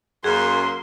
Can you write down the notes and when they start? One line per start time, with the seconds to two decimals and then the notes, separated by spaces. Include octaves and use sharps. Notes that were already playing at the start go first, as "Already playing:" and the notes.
0.24 F#2 A#3 G#4 C6